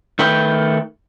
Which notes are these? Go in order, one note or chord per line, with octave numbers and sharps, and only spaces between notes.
D#3 A3 B4 G5